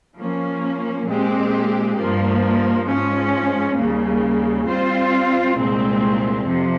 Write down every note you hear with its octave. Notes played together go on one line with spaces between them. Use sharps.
F3 A#3 C#4
A#2 G#3 C4 G4
G2 F3 A#3
G#2 F3 G#3 C#4
D#2 C#3 G3 A#3
G3 C4 F4 C5
C2 A#2 G#3 C4
F2 C3 F3